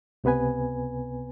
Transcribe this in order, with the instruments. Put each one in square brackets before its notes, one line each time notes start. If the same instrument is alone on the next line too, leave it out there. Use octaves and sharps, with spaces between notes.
[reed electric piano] C#2 C3 B3 B4 G#5